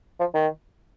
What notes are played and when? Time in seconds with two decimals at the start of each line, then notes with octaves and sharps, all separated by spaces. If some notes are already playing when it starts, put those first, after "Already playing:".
0.20 F3
0.34 D#3